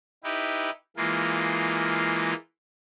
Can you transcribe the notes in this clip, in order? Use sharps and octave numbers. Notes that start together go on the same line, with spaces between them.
D#4 E4 G4 B4
E3 G#3 A#3 F4